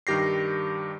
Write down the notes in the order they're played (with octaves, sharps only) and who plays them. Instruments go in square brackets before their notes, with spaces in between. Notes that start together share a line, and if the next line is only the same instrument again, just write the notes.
[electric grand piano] G2 D#3 G4 A#6 C7